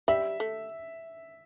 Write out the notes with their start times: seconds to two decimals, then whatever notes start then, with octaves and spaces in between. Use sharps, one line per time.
0.08 G3 E5
0.40 A3